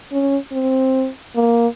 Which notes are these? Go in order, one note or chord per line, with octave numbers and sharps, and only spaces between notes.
C#4
C4
A#3